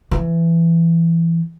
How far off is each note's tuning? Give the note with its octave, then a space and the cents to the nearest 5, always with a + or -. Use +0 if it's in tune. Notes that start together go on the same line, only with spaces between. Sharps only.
E3 +20